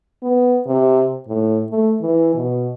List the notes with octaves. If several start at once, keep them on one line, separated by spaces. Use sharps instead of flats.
B3
C3
A2
A3
E3
B2